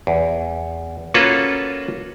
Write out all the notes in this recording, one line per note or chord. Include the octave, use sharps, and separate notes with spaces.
E2
A#3 C#4 F4 F#4 A4 B4